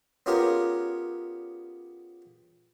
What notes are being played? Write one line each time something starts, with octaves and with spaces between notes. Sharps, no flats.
B3 C#4 F4 G4 G#4 A#4